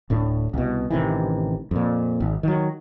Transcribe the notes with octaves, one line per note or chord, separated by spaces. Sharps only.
D1 A2 D4
C2 B2
A1 C3 D#3 E3
F2 A#2
G#1
D#3 F#3